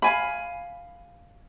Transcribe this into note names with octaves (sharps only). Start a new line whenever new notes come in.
F5 G#5 B5